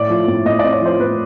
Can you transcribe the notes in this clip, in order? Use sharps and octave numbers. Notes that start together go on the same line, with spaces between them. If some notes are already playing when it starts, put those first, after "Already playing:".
Already playing: A2 D5
F3
A2
A2 D#5
D5
C4
C#5
F3 C5
A2 B4